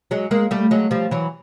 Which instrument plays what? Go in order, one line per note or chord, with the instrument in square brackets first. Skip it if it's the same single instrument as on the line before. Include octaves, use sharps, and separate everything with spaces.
[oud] F#3 G#3
G#3 A#3
G3 A3
F#3 G#3
F3 G3
E3 F#3